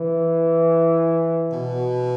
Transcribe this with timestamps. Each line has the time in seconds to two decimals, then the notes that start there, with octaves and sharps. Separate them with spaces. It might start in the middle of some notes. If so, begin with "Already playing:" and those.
Already playing: E3
1.52 B2